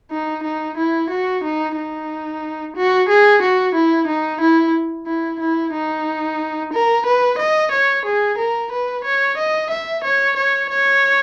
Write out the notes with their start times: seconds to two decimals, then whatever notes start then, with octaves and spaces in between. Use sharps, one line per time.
0.11 D#4
0.44 D#4
0.77 E4
1.10 F#4
1.44 D#4
1.76 D#4
2.76 F#4
3.09 G#4
3.42 F#4
3.75 E4
4.08 D#4
4.41 E4
5.07 E4
5.40 E4
5.73 D#4
6.73 A#4
7.06 B4
7.38 D#5
7.71 C#5
8.05 G#4
8.38 A#4
8.72 B4
9.04 C#5
9.37 D#5
9.70 E5
10.04 C#5
10.36 C#5
10.70 C#5